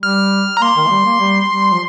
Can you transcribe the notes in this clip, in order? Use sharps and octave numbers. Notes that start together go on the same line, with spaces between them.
G3 F6
A#5
A#3 C6
D#3
A#3
G3
A#3
G3
G3
F3